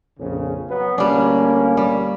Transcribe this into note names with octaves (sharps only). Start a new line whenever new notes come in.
A#1 F2 C#3
F#3 B3
D2 G3 A#3 C#4 D4
G3